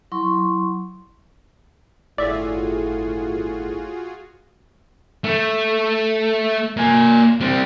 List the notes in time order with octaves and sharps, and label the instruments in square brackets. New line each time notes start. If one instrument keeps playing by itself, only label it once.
[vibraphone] F#3 E4 C6 C#6
[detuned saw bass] G1 [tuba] A2 [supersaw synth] F4 F#4 G#4 [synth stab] D5 E5
[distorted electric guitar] A3
A#3 G#5
G3 C4